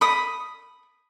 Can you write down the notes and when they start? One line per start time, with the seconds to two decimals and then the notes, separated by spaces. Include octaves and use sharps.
0.01 B5 D#6